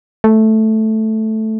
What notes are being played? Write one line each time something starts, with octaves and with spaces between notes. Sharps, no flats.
A3